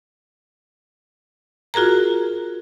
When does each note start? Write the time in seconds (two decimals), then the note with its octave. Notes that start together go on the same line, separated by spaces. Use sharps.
1.74 F4 F#4 G#4 A#4 A#5